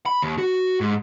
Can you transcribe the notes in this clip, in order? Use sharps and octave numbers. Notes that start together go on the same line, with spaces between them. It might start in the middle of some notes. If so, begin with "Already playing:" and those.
B5
D#2
F#4
G#2